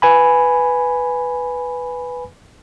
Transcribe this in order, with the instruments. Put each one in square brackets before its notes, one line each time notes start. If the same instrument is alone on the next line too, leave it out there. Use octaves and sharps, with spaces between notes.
[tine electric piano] B4 G#5 B5